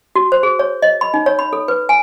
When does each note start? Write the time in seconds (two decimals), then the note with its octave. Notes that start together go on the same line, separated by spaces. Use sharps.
0.16 F#4
0.32 C5
0.43 G#4
0.59 C#5
0.82 D#5
1.01 B5
1.14 D#4
1.26 C#5
1.39 B5
1.53 A4
1.68 B4
1.89 G#5